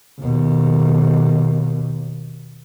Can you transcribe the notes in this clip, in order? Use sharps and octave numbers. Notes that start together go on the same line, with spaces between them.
D#2 B2